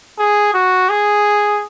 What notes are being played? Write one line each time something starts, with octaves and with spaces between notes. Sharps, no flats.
G#4
F#4
G#4